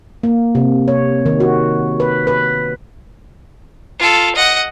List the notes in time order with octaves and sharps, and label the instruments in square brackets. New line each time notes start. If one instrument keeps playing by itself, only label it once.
[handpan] A#3
C3
C#5
D#3
F#4
B4
B4
[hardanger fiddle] F4 A4
D#5 F#5